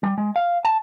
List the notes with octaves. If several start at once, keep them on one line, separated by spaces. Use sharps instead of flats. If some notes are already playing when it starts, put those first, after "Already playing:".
G3
G#3
F5
A5